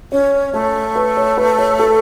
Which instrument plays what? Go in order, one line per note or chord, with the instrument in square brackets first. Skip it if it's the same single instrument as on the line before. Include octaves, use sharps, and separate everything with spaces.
[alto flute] C#4 [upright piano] C#5
[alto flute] A3 [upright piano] C#5
[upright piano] B4
C#5
B4
C#5
A4